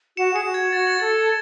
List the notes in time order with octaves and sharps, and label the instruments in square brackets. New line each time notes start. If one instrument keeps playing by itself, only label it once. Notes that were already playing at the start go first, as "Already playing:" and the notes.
[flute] F#4 [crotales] C#7 E7
[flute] G#4 [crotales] C#7 E7
[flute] F#4
[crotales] G#6
[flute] F#4 [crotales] A6
[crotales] G#6
A6
[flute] A4 [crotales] A6